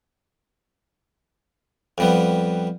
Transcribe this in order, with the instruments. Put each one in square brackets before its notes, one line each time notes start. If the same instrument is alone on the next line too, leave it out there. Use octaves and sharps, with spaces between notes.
[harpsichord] F2 G3 B3